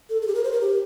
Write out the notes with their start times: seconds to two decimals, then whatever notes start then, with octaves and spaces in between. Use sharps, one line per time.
0.10 A4
0.22 A4
0.27 G4
0.35 A#4
0.44 C5
0.52 A#4
0.61 G4